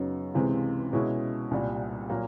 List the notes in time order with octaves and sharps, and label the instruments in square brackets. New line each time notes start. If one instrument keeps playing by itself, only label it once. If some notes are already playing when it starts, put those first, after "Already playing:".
Already playing: [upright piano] F#2 C#3 F#3 B3 D#4
C#2 C3 E3 G#3 C4
B2 G#3 C#4 E4
C2 A#2 G3
A#2 F#3 A#3